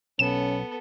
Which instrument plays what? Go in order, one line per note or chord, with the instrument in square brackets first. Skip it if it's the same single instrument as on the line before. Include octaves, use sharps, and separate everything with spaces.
[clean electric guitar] B1 [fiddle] B3 A4 [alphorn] C#4 [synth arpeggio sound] E7